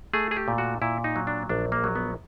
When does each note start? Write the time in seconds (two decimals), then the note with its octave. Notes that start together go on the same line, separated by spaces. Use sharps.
0.13 A3 G#4
0.31 G#4
0.36 G4
0.48 A#2
0.58 F#4
0.82 A#2 E4
1.04 D#4
1.16 F#3
1.27 D4
1.49 A#1 D4
1.72 A#3
1.84 F#3
1.95 B3